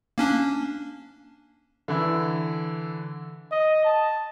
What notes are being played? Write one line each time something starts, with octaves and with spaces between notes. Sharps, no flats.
A#3 C#4 D4
D3 E3 E4
D#5
A5